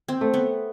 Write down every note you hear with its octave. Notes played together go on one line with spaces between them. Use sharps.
C4
A3
B3